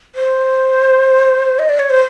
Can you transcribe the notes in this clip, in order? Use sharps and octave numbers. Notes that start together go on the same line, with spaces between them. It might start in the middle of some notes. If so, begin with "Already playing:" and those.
C5
D#5
D5
C#5
C5